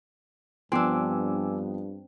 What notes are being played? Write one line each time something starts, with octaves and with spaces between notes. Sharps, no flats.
G2 F3 B3 C4 D4 G#5 D6 E6